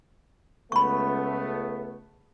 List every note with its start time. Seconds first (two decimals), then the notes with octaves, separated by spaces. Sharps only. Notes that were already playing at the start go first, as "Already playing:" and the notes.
0.72 C#2 A3 B3 B5 C#6